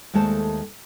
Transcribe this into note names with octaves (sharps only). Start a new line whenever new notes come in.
D#2 G#3 A3 A4 C5 A5